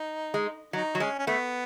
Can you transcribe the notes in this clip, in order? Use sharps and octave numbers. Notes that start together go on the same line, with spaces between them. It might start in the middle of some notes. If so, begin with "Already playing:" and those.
Already playing: D#4
G#3
F#3 D#4
F#3
G#3 C#4
C#4
A3 B3